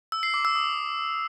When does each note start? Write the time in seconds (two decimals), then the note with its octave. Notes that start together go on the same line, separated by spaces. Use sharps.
0.12 E6
0.23 C7
0.34 D6
0.45 E6
0.56 D#6